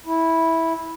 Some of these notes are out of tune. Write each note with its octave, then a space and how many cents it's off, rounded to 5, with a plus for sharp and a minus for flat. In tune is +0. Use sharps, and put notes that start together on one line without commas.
E4 -10